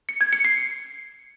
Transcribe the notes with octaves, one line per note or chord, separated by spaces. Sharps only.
C#7
G#6
C#7
C7